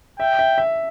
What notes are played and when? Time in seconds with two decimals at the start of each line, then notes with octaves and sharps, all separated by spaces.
0.19 E5 G5
0.39 E5
0.58 E5